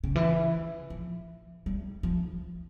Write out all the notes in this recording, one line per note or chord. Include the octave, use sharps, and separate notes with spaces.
C#3
E3
F3
G3
F3